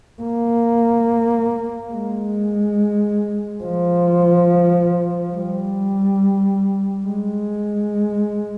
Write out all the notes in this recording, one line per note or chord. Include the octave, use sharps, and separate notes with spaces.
A#3
G#3
F3
G3
G#3